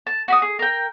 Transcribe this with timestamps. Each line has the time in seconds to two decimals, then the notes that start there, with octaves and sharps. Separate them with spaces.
0.07 A5
0.28 F#4 B5 D#6
0.42 G#4
0.59 A#4 G5